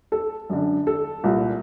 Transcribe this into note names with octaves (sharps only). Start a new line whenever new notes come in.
A4
F#2 D3
A4
C2 A#2